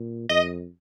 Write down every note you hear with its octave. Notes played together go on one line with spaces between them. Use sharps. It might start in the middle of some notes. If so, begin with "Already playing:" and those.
Already playing: A#2
F2 D#5